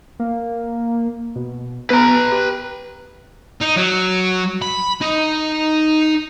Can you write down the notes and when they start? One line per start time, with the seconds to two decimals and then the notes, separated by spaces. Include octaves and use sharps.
0.19 A#3
1.36 B2
1.90 B3 B4 A#5
2.32 G4
3.62 D#4
3.77 F#3
4.62 B5
5.02 D#4